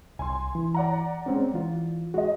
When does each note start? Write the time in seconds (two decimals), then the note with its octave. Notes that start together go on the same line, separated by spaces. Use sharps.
0.19 C2 G#5 C6
0.55 E3
0.74 D5 F#5 A#5
1.26 G#3 C4 C#4
1.54 E3 F4
2.14 G#3 F#4 D#5